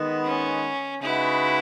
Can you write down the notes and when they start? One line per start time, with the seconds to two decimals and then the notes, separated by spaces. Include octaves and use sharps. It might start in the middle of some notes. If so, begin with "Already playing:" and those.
Already playing: D#3 G#3 B3
0.25 C#4
1.02 C#3 G#3 D#4 E4 F#4 B4